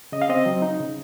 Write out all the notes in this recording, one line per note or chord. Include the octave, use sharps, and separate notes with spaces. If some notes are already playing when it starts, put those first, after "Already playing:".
C#3 D#5
F5
C4 D#5
F#3
D#4
C#3